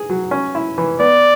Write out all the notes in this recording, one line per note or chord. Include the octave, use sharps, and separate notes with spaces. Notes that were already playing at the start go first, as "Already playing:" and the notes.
Already playing: G#4
F#3
C#4
E4
E3
B3 D5